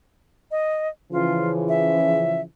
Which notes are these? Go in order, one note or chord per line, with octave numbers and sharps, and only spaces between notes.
D#5
C#3 E3 F3 F4
E5